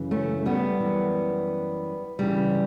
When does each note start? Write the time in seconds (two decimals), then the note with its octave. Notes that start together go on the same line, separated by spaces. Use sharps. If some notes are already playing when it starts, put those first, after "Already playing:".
Already playing: F#2 C#3 E3
0.11 A3 C#4
0.46 G3 B3
0.80 F#2 E3
2.19 D2 C#3 E3 G3